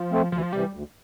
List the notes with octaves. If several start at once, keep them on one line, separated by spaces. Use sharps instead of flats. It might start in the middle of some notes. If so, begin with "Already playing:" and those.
Already playing: F3
A3 C4
D2 F3
E3
F3
C3 E3 G3
D2